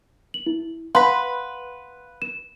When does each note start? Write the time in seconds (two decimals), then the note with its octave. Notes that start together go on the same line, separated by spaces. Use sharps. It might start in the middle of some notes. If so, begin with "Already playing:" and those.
0.34 F#7
0.46 E4
0.95 B4 F5 F#5 B5 C6
2.22 E7